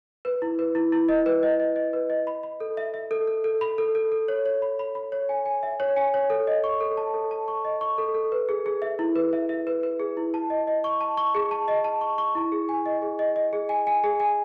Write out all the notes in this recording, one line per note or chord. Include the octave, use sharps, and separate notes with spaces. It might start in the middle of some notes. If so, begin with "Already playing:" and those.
B4
E4
B4
E4
E4
D#5
B4
D#5
D#5
D#5
B4
D#5
B5
B5
A4
E5
E5
A4
A4
A4
B5
A4
A4
A4
C#5
C#5
B5
B5
B5
C#5
G#5
G#5
E5
C#5
G#5
C#5
A4
D#5
C#6
A4
A5
A4
A5
C#6
D#5
C#6
A4
A4
B4
G#4
G#4
E5
E4
B4
E5
E5
B4
B4
G#4
E4
A5
D#5
D#5
C#6
A5
C#6
G#4
A5
D#5
A5
C#6
C#6
E4
G#4
G#5
D#5
G#4
D#5
D#5
G#4
G#5
G#5
G#4
G#5